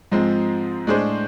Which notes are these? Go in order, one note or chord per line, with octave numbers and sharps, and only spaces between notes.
G#2 F3 G#3 C4
A2 G#3 D4 G#4 C5